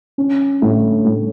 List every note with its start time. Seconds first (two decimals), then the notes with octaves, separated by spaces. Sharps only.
0.18 C#4
0.62 A2
1.05 A2